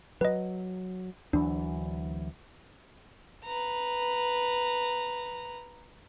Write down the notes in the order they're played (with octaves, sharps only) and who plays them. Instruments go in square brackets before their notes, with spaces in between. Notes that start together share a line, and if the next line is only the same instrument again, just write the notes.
[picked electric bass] F#3 [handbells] B4 D#5
[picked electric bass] D2 E3 F#3 [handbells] D4
[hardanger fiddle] B4 A#5